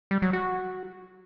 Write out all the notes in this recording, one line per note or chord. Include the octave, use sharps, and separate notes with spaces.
G3
F#3
F#4